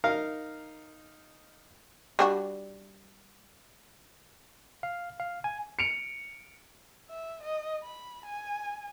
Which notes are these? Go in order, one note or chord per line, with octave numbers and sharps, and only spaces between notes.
D#4 A#4 F5
G3 D4 F#4
F5
F5
G#5
C#7 D7 F7
E5
D#5
B5
G#5